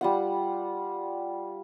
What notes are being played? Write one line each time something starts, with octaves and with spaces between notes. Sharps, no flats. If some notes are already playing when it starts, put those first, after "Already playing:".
G3 F4 F#5